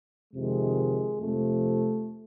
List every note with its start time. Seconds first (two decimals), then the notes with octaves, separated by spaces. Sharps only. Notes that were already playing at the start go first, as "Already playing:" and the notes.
0.33 F2 C3 D#3 G#3
1.20 F2 C3 F3 A3